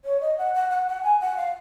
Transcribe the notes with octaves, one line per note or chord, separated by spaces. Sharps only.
C#5
D#5
F#5
F#5
F#5
F#5
G#5
F#5
F5